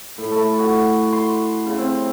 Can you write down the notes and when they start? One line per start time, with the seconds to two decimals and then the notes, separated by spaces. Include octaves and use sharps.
0.18 A2
0.31 A3
0.59 F#4
1.13 C6
1.66 C#3
1.78 C4